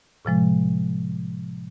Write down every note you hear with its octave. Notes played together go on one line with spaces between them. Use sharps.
A2 C3 F3 G#3